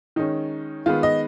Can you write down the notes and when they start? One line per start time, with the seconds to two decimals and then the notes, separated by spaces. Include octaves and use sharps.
0.16 D#3 G#3 C#4 D#4
0.86 D#3 G#3 B3 F4
1.03 D#5